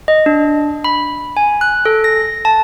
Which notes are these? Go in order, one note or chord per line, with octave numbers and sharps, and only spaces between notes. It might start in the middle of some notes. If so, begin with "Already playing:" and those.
D#5
D4
B5
G#5
F#6
A4
A#6
A5